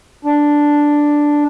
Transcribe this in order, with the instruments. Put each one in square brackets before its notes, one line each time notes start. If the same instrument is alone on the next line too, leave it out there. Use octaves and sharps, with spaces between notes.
[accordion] D4